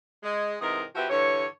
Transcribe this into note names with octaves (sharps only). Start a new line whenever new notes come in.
G#3
G#2 C3 E3 A#4 D#5
F3 C4 F#4 G4 B4 E5
G2 D3 E3 C#5